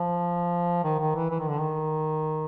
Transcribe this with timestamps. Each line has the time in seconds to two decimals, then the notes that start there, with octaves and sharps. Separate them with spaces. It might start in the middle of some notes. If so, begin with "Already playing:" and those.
Already playing: F3
0.84 D#3
0.99 D#3
1.15 E3
1.31 E3
1.40 D#3
1.49 D3
1.59 D#3